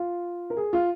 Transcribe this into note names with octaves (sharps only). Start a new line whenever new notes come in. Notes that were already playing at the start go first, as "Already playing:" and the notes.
Already playing: F4
A#4
G#4
F4